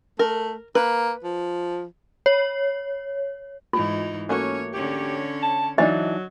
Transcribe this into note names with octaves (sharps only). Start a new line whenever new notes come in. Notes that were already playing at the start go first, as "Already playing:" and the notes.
A3 A#4
A#3 B4
F3
C#5
G#2 E3 D#4 F4
A3 A#3 C#4 F#4 C#5
D3 C#4 G4 C#5
A5
E3 F#3 D4 D#4 D#5